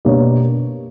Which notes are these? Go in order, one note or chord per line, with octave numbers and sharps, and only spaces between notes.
B2 A#3 D4 G4 C#5